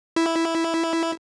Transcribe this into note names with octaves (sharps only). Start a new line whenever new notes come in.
E4